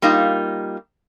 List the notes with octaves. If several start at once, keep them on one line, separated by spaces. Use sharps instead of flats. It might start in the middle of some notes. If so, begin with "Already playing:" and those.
G3 A#3 D#4 F4